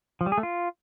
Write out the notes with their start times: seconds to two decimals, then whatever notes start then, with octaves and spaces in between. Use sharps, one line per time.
0.21 F3
0.26 G3
0.32 G#4
0.38 A3
0.43 F4